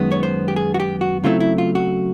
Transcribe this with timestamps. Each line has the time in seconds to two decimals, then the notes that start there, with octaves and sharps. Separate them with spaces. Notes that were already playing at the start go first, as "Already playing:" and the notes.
Already playing: F#2 D#3 G#3 B3
0.12 C#5
0.23 C5
0.48 G4
0.56 G#4
0.74 F#4
0.80 G4
1.01 F#4
1.24 C#3 F#3 A3 C4 E4 F4
1.40 E4
1.58 F4
1.75 F#4